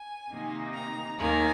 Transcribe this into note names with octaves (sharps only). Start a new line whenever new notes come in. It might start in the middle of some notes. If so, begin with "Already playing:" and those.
Already playing: G#5
C3 D#3 A#3 D#4
A#5
D#2 D#3 A#3 G#5